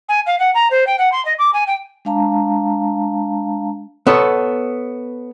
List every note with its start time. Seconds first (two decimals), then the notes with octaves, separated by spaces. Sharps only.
0.09 G#5
0.26 F5
0.39 F#5
0.54 A#5
0.71 C5
0.87 G5
0.99 F#5
1.12 C6
1.25 D#5
1.39 D6
1.53 G#5
1.67 G5
2.05 G#3 D4 F5 A5 A#5
4.07 B3 A4 C#5